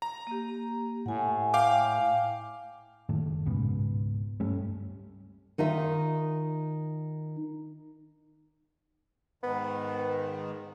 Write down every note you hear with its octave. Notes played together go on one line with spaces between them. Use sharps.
A#5
A#3 G4
A2 F#5 G#5
F5 G5 D6
F#1 A2 D#3 A3
C#2 G#2 B2
G2 G3 A3 C#4
D#3 D#4 F4 E5
G#2 D#3 B3